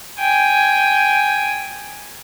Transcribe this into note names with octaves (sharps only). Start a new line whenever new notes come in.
G5 G#5